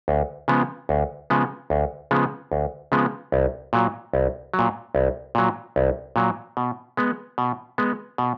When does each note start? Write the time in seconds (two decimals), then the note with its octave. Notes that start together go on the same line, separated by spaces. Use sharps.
0.08 D2
0.48 C#3 F3 G#3 B3
0.89 D2
1.30 C#3 F3 G#3 B3
1.70 D2
2.11 C#3 F3 G#3 B3
2.52 D2
2.92 C#3 F3 G#3 B3
3.32 C2
3.73 A#2 F#3
4.14 C2
4.54 F#3
4.59 A#2
4.95 C2
5.35 A#2 F#3
5.76 C2
6.16 A#2 F#3
6.57 B2
6.97 G#3 B3
7.38 B2
7.78 G#3 B3
8.18 B2